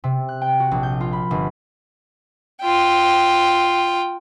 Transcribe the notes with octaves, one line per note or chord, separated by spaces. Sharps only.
C3
F#6
G5
F#4
A#1
G6
F4
B5
G1
F4 G5